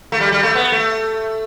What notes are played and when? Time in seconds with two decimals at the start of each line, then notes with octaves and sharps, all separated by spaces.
0.12 A3
0.20 G3
0.32 G3
0.43 A3
0.55 B3
0.72 A3